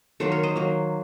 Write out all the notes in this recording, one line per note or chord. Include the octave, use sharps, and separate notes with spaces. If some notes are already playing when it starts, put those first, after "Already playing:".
D#3 F#3 A#3 A4 C5
A#4 C#5
C5 D#5
D#3 F#3 A#3